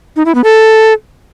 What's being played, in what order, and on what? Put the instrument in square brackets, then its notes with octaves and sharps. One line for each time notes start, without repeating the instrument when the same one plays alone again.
[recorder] D#4
E4
B3
A4